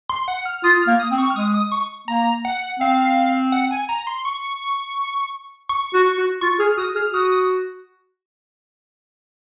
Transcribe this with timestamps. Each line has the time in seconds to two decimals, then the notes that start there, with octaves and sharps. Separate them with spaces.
0.09 C6
0.28 F#5
0.45 F6
0.64 F4 D#6
0.82 F6
0.88 A#3
0.99 D#6
1.11 C4
1.18 C#6
1.30 F6
1.36 G#3 D#6
1.54 D#6
1.72 C#6
2.08 A#3 A#5
2.45 F#5
2.80 C4 F5
3.52 F#5
3.71 G#5
3.89 A#5
4.07 C6
4.25 C#6
5.69 C#6
5.94 F#4
6.18 F#4
6.41 F4 C#6
6.59 G#4 F6
6.78 F#4 D#6
6.95 G#4 F6
7.13 F#4 D#6